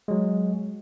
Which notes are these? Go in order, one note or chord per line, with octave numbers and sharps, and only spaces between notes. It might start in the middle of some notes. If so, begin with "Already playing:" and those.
F#3 G#3